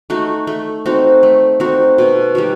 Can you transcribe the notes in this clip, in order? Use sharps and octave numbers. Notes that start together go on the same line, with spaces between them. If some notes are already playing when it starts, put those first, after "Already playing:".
A3 D#4 F#4
A3
C4 D#4 F#4
A3
C4 D#4 F#4
B2
G3 D#4 F#4